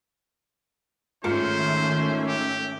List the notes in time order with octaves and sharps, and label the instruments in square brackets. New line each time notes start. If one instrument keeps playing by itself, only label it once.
[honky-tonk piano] G#2 F4 C#7 [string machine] D#3 E5 [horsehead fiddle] A3 C#4 [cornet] C5
[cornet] G4